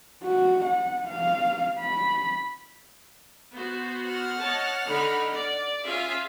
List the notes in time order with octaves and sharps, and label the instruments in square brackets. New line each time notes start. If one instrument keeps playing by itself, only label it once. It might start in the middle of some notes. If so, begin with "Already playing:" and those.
[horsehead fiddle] F#4
F#5
F5
B5
[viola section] B3 F#4 C5
[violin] F#5 F6
[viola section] C#5 D#5 A5
D3 D#4 B5
D5
[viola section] C#4 F4 F5 [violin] G#4 E5